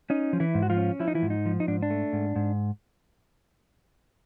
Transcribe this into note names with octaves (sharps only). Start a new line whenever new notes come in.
C#4 D#4
F3
E3 E4
G#2
F#4
F3 F4
C#4
F3 E4
D#4
E3 E4
G#2
D#4
F3
D#4
G#2 D4
D4
A3
G#2
G#2